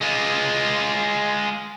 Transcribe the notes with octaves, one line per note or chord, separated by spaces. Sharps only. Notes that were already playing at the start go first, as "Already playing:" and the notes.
G#3 F4